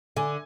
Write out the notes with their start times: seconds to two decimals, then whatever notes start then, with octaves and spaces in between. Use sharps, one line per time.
0.17 D3 G#5